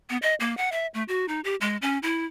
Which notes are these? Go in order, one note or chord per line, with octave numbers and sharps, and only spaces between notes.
B3
D#5
A#3
F#5
E5
A3
F#4
D#4
G4
G#3
C#4
E4